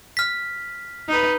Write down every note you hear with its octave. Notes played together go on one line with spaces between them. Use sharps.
F6 B6
D#4 B4